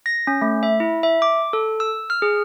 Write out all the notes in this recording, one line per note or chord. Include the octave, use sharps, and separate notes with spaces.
A#6
C#4
A3
E5
E4
E5
D6
A4
E6
F6
G#4